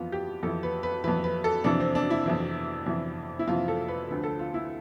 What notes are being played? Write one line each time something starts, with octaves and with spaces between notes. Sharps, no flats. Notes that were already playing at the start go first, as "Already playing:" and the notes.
Already playing: F2 E3 B3 F4
G4
F2 E3 A4
B4
B4
F2 E3 B4
B4
A4
F2 C3 E3 D4
C4
D4
E4
F2 C3 E3
F2 C3 E3
E4
F2 C3 E3 F4
A4
B4
D2 D3 F3 B4
A4
F4
E4